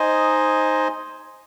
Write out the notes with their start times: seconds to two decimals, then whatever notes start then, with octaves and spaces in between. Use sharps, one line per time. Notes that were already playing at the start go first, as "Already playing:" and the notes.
Already playing: D#4 C5 D#5 G#5